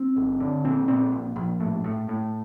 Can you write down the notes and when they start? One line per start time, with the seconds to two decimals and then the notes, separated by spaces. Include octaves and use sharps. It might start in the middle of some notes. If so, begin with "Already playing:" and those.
Already playing: C4
0.16 G1
0.40 D3
0.64 A#1 C4
0.88 A#2 C4
1.12 A#1
1.36 A#1
1.60 A2
1.84 A2
2.09 A2